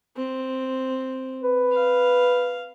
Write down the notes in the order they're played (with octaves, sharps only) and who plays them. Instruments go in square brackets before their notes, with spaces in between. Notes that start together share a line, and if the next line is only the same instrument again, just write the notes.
[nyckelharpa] C4
[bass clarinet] B4
[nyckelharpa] F5